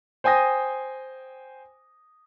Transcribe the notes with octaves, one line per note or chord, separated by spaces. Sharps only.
C5 G5 G#5 D#6 A#6